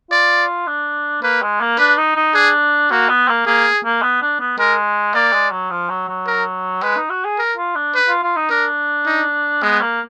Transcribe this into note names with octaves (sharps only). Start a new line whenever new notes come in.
F4 D5
D4
A#3 B4
G#3
A#3
D4 B4
D#4
D#4
D4 G#4
A#3 F#4
B3
A#3
A#3 G#4
A#3
B3
D4
B3
G#3 A#4
A#3 D5
G#3
F#3
F3
F#3
F#3
A#4
G#3 B4
D#4
F#4
G#4
A#4
F4
D4
B4
F4
F4
D#4
D4 A#4
D#4
G#3 B3
A#3